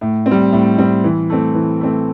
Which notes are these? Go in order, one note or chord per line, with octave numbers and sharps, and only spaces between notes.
A2
C4
G3
A2
G3 C4
E3
A3 C4
E3
A3 C4